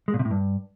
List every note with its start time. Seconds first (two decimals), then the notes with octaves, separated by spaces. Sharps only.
0.08 G#3
0.14 A#2
0.19 C3
0.25 A2
0.31 G2